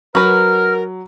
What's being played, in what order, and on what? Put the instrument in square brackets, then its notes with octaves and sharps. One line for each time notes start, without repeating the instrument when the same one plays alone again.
[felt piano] F#3 [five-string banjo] F#4 B4 [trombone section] A#4 [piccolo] F6